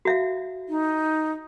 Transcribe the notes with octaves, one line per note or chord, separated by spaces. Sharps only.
F#4 E5 F5
D#4